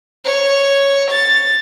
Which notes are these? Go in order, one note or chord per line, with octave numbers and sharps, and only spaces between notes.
C#5
A6